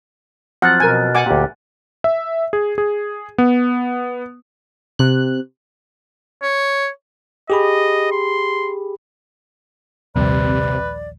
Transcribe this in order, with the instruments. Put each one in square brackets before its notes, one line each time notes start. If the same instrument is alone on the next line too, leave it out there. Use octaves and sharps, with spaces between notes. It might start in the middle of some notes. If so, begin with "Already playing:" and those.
[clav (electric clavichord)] F3 F#3 C4 [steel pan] F#5 [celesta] F6 F#6 A6
[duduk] B2 [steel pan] A#4 G#5
[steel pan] F#5 G#5 D6
[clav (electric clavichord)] D2 A#2 [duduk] G4
[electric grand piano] E5
G#4
G#4
B3
[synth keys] C3 F#6
[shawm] C#5
[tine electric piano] G4 G#4 B5 [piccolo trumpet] D#5
[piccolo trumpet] C6
[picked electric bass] A#1 D#2 G3 [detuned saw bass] C3 [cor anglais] B4 [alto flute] D5